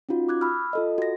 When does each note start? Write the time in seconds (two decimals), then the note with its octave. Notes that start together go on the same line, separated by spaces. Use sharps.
0.09 C#4 D#4 F4 F#4
0.28 D6 F#6 G#6
0.41 B5 E6 F6
0.73 F4 A4 D#5
0.98 F#4 A#6